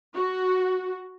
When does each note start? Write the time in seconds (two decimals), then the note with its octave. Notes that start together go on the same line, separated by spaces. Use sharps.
0.15 F#4